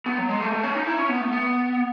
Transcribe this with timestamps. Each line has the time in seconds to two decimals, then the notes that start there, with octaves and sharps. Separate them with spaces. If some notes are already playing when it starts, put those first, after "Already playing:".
0.06 B3
0.18 F#3
0.29 G#3
0.40 A3
0.52 A3
0.63 C#4
0.75 D#4
0.86 E4
0.98 C#4
1.08 B3
1.21 A3
1.32 B3